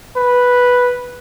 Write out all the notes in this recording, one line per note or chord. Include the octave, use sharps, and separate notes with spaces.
B4